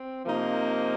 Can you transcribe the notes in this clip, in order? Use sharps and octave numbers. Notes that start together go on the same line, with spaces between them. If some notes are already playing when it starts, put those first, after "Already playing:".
Already playing: C4
C3 F3 A#3 D#4